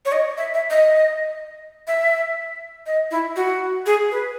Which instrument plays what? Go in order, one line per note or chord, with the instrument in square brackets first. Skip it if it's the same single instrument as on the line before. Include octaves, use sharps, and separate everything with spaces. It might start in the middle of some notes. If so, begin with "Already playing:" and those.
[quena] C#5
D#5
E5
E5
D#5
E5
D#5
E4
F#4
G#4
B4